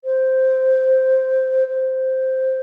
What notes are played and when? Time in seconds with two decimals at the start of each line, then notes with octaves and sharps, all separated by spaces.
0.04 C5
1.68 C5